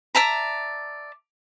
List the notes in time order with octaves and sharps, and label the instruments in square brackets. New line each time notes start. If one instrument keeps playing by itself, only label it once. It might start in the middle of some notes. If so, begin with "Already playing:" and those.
[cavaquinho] D5 E5 A5 A#5